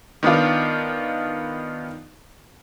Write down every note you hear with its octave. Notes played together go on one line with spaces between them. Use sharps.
D#3 B3 D4 F4